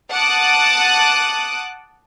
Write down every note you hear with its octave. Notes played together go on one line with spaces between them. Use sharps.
F#5 A5 D6 D#6 F#6